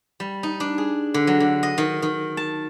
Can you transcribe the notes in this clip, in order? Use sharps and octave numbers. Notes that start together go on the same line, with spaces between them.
G3
D#4
D4
G#4
D3
F#3
D3
D#5
D#3
D#3
A5